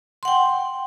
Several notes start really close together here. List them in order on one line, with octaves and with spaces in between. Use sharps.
C6 F#5 G5